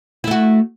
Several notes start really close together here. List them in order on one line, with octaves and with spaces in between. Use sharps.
E4 A3 F#4